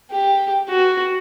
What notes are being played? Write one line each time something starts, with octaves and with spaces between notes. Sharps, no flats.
G4
F#4